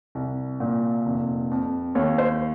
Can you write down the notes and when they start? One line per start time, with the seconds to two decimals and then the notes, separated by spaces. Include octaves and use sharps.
0.15 C2
0.60 A#2
1.06 F1
1.51 F2
1.95 D#2 C#5
2.18 C5